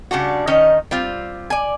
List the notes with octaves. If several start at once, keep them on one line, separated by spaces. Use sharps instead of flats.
C#3 G3 D4 F#4
D#3 C#4 D#4 D#5
G3 C4 F4
D5 G#5